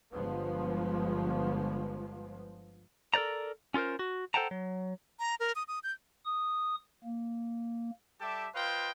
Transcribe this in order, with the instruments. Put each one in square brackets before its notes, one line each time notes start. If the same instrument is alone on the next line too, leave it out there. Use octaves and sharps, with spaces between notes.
[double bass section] G1 F3 G#3 B3
[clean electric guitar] A4 A#4 C5 D5 A#5
C#4 F4 A4 A#4 C5
F#4
A4 C5 F#5 G5 A5 A#5
F#3
[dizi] A#5
A#4
D#6
D#6
G6
[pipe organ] D#6
A#3
[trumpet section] G3 G4 A4 E5 A5 D6
F4 B4 C5 D#5 F5 G5